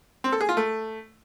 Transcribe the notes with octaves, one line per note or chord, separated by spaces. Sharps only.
C4
A4
G#4
F4
A3